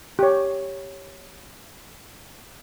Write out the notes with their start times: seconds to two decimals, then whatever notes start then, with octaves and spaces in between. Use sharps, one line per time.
0.19 G4 C#5